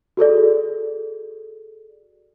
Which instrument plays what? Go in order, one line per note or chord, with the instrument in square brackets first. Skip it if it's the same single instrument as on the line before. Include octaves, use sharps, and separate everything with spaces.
[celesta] F#4 G#4 A4 D5